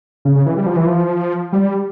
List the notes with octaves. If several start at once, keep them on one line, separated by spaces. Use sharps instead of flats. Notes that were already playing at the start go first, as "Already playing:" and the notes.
C#3
C#3
E3
G3
F3
E3
F3
G3